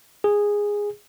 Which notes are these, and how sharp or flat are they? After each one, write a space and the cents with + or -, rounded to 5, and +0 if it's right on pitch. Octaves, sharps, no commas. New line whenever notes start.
G#4 -10